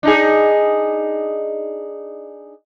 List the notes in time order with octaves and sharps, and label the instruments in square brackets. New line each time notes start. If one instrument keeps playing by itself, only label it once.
[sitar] D4 D#4 G#4